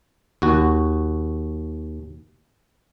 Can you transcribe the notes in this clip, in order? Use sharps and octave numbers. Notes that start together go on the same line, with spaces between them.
D#2 F#4